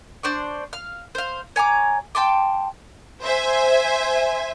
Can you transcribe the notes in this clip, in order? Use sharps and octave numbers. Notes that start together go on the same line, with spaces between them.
D4 C5 D5 C#6
F5 F6
C5 F5
C#5 G#5 A#5 D6
G5 A5 C6 D6
C5 E5 G#5